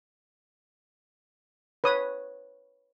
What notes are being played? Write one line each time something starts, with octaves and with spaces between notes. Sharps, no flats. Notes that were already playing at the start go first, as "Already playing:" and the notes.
B4 C#5 D#6